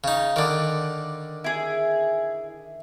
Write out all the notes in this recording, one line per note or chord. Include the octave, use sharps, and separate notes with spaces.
C#3 D#4
D3 D#3 D5 D6
E4 G#4